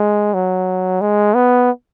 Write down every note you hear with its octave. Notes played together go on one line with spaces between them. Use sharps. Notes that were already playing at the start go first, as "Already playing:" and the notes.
Already playing: G#3
F#3
G#3
B3